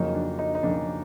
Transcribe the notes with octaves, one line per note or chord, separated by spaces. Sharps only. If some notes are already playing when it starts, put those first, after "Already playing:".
Already playing: F2 C#3 F#3 A#3 D#4
D4
D#4
D#4
F2 C#3 F#3 A#3 D4